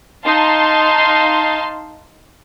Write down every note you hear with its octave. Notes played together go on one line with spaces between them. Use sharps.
D#4 F5 A5 C6